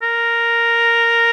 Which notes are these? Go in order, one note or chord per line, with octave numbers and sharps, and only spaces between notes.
A#4